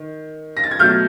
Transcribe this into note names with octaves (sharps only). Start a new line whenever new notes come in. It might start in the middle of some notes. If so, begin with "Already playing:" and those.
Already playing: D#3
A#6
A6
G#6
B2 F#3 A3 F6 G6